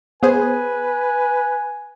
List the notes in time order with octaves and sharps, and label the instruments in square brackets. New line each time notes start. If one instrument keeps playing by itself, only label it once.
[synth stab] B3 G#4 C5 [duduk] B4 [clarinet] G#5